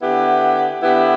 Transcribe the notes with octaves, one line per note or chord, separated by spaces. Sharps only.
D3 B3 E4 G4
D3 B3 E4 G4